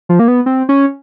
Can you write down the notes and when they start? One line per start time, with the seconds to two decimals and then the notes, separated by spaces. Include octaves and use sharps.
0.09 F3
0.19 A#3
0.28 B3
0.46 C4
0.69 C#4